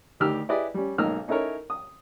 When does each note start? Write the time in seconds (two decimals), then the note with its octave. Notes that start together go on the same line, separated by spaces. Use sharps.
0.20 D2 D#3 G4 E6 F6
0.49 E4 G4 G#4 B4 D5 D#5
0.74 G3 C#4
0.98 B1 G#2 A#3 D#5 E6 F6
1.28 C#4 D#4 E4 A4 A#4 C#5
1.70 D#6